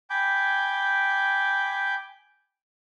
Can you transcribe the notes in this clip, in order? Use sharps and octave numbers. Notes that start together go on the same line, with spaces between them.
G5 G#5 B5 D6 G6